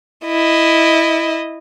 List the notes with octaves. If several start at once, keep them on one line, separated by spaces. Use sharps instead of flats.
E4 D#5